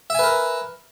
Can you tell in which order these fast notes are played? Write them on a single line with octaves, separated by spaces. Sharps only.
E5 G#5 B4 A#4